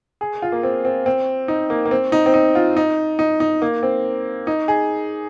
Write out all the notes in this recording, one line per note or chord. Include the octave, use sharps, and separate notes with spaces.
G#4
F4
A#3
C4
C4
C4
D#4
A#3
A#3
C4
D#4
C4
D#4
F4
D#4
D#4
D#4
A#3
C4
D#4
G#4